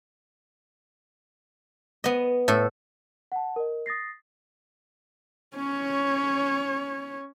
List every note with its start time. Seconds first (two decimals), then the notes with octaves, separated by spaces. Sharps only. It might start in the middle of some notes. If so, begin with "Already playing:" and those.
2.04 B3 D#5
2.48 A2 A4
3.32 F#5 A5
3.56 A#4 D#5
3.86 D#6 A6 A#6 C7
5.56 C#4 C#5